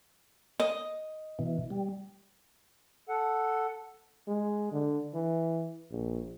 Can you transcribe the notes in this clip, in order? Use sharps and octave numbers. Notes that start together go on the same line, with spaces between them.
D#5
B2 E3
G3
A4 F#5
G#3
D3
E3
A#1